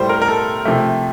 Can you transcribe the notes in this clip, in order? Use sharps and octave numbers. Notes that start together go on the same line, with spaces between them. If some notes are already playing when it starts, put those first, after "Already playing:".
Already playing: A2 G3 C5
A#4
A#4
A4
C3 F3 A3